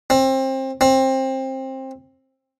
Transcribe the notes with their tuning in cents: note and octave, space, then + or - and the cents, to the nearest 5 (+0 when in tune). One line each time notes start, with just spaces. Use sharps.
C4 +25
C4 +20